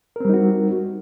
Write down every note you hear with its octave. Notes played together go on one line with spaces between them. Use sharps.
G3 C4 D#4 F#4 A#4